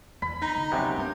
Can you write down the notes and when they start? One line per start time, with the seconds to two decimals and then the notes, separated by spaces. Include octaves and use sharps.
0.22 E2 B5
0.42 D#4 A#5
0.56 D3
0.72 F#2 C3 G3 B3 G5
0.98 G2 G3